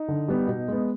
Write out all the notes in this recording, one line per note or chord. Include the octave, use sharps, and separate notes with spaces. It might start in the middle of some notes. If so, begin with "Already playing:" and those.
Already playing: D#4
D3
G3 B3
B2
G#3 B3